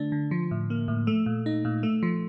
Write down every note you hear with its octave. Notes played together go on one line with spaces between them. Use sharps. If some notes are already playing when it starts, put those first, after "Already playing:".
Already playing: D3 A3 D4
D3
F3
A2
A#3
A2
A3
A#2
D#4
A#2
A3
F3